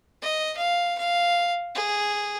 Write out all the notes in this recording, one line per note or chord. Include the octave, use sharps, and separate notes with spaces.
D#5
F5
F5
G#4